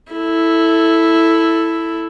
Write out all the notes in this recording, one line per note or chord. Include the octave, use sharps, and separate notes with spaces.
E4 A4